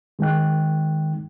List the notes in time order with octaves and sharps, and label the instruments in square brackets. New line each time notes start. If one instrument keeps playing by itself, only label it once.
[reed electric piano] D#3 G#3 D#4 G5 F#6